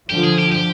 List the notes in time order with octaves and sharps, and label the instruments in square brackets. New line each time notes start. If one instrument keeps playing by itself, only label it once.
[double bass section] D3 F3 [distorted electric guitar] G4
[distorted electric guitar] G#4
G4
G4